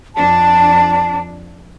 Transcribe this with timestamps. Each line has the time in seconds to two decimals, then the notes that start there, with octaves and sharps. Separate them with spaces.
0.16 F2 D4 A5